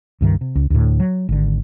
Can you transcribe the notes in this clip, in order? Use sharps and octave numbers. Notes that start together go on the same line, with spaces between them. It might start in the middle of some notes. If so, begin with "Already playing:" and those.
C#2 G2 D#3
C3
C#2
D2 A2
F#3
G#1 D3